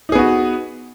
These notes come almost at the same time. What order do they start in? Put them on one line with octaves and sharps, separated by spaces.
D#4 G#4 B3 F#4